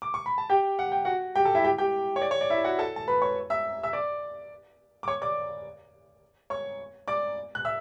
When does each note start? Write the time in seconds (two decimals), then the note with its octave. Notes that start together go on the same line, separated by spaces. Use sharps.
0.02 D6
0.14 C#6
0.26 B5
0.38 A5
0.50 G4 G5
0.79 F#5
0.92 G5
1.05 F#4 F#5
1.35 G4 G5
1.45 A4 A5
1.55 E4 E5
1.64 G4 G5
1.78 G4 G5
2.16 C#5
2.22 D5
2.31 C#5
2.41 D5
2.50 E4 E5
2.64 F#4 F#5
2.79 A4 A5
2.96 A5
3.08 B4 B5
3.22 C#5 C#6
3.50 E5 E6
3.83 E5 E6
3.93 D5 D6
5.03 D6
5.08 C#5 C#6
5.22 D5 D6
6.50 C#5 C#6
7.08 D5 D6
7.55 F#6
7.65 E5 E6